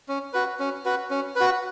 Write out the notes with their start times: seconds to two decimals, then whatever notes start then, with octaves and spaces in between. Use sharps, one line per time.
0.08 C#4
0.33 F#4 B4
0.59 C#4
0.85 F#4 B4
1.10 C#4
1.36 F#4 B4